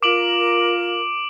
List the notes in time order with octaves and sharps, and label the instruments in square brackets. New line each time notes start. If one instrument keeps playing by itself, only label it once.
[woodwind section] F4 A#4 [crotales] D6 D7 F#7